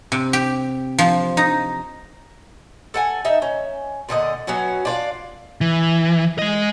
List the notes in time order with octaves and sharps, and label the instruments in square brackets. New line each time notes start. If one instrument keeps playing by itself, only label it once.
[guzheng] C3
G4
F3
D#4
[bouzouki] A4 F#5 G#5
D#4 E5
C#4
A#2 D3 G4 D#5
F#3 B3 C#4 F#4
D4 F4 D5
[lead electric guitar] E3
G#3 D#5